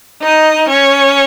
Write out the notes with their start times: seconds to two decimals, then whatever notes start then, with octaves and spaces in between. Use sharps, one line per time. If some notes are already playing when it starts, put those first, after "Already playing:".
0.22 D#4 D#5
0.68 C#4 C#5